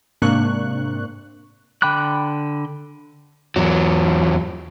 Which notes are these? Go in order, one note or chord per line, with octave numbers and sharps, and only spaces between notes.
G#2 C3 A#3 D4 C#6 F#6
D3 G5 B5 D6 F#6
E2 F#3